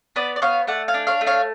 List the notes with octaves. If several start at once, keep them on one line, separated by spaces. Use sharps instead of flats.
B3 B4 D5
D5
B3 C#5 F5
A3 D5 F#5
F5 G#5
D4
C#5 F5
A3
C#5 F5